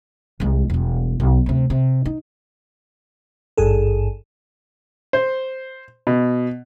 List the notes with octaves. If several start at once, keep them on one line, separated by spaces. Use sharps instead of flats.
C2 G#3
E1 G3
B1
D2 C3
C3
D#4
G#1 G2 G#4 A4
C5
B2